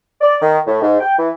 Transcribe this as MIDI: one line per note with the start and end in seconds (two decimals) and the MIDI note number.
0.21 0.36 74
0.42 0.58 51
0.67 0.80 45
0.82 0.99 44
1.01 1.15 79
1.18 1.30 52